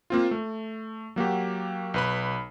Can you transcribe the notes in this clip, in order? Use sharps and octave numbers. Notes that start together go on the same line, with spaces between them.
A#3 C4 F4
A3
F#3 A#3 F#4 G4
B1 B4 B5